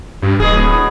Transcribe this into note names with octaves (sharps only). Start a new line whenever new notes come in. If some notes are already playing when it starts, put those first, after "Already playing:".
G2
D1 B2 F#3 G#4